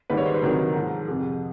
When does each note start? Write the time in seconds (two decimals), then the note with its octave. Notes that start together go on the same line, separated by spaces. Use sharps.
0.10 G#2 D#3 G3 B4
0.17 C#5
0.26 C5
0.34 B4
0.42 D2 C3 D#3 F#3 A#4
0.76 G#2 F3
1.08 F2 C3 F3 G#4